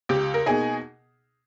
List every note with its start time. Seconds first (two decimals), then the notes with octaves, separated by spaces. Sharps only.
0.09 C#2 G4
0.34 A#4
0.46 B2 A#3 D#4 G#4